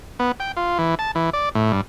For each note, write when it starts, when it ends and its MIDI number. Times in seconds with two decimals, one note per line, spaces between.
0.19 0.32 59
0.40 0.52 79
0.57 0.78 65
0.79 0.95 52
0.99 1.11 81
1.15 1.30 52
1.33 1.49 74
1.55 1.72 45
1.72 1.81 43